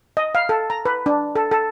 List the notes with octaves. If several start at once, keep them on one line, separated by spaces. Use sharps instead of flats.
D#5
F5
A4
A#5
B4
D4
A4
A4